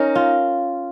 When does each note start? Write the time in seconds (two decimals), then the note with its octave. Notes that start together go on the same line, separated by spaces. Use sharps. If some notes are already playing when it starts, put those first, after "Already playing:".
Already playing: C#4 D#4 A#4
0.15 F4